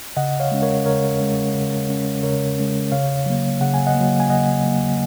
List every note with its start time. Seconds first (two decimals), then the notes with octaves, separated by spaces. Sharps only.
0.17 C#3 D#5 F#5
0.40 C#5 F5
0.52 G#3 C#4
0.62 A#4 C#5
0.86 C#3 A#4 C#5
1.20 G#3 C#4
1.54 C#3
1.89 G#3 C#4
2.23 C#3 A#4 C#5
2.58 G#3 C#4
2.92 C#3 C#5 F5
3.26 F#3 A#3
3.61 C#3 F#5
3.74 G#5
3.87 D#5 F#5
3.95 A#3
4.00 F#3
4.20 G#5
4.29 C#3 D#5 F#5
4.65 F#3 A#3